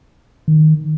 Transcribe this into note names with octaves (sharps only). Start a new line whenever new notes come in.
D#3